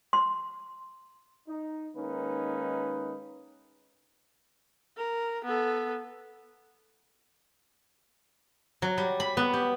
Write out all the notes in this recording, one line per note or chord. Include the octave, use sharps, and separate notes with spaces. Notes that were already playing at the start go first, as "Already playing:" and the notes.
C6
D#4
D#3 G#3 A#3 C#4 D#4 B4
A#4
B3 A4
F#3
G3
B5
B3
G4